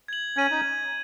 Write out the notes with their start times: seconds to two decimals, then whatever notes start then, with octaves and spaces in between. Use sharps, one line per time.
0.08 G#6 F#7
0.36 C#4 G#6 D#7 F#7
0.51 D#4